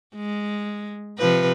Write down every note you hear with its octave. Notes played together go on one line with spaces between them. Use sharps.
G#3
C3 F3 B4